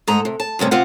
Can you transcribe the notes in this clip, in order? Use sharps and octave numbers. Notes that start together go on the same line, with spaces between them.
G#2 A4 D#5 A#5
C3
A5
D2 G2 C3 C#4
C3 C4 F4 F#5